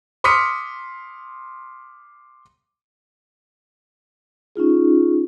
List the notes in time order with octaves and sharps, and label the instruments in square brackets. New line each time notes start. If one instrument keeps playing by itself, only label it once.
[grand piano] C6 D6 D#6 F6 B6 C#7
[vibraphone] C#4 D#4 F4 G#4